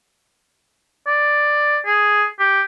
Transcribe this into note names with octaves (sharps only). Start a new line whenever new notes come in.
D5
G#4
G4